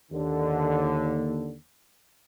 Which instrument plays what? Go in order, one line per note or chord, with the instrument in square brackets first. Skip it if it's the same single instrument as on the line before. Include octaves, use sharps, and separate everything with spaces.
[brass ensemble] D#2 D3